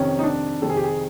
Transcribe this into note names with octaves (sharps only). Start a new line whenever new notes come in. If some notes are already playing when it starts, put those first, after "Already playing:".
Already playing: F2 C3 D#3 C#4
D#4
D4
F2 C3 D#3 A4
G#4
G4
G#4